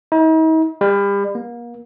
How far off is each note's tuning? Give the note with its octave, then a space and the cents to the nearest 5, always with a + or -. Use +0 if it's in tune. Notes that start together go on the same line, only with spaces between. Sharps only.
D#4 +45
G3 +35
A#3 +35